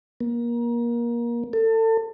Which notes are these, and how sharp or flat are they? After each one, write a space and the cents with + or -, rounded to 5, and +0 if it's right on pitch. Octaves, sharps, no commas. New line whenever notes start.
A#3 +25
A4 +30